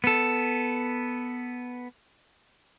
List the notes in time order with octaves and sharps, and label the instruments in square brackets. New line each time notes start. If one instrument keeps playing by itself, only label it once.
[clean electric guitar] B3 A4